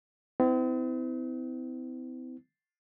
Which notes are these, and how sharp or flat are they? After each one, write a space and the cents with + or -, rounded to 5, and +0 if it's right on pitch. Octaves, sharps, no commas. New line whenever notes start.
C4 -45 E4 -25